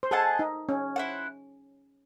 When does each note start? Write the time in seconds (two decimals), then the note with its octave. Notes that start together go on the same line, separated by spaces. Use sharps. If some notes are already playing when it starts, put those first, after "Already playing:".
0.03 C5
0.11 G#4 A4 D#5 F#5 A5
0.39 D#4
0.69 C#4
0.96 E4 C5 F#5